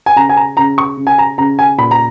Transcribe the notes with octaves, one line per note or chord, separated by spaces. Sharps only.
G#5
C#3 A#5
G#5
A#5
C#3 A#5
C#6
C#3
G#5
A#5
C#3 A#5
G#5
A#2 B5
A#5